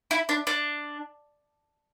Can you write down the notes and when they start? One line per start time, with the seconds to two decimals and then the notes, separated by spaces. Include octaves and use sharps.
0.11 E4
0.29 D4
0.47 D4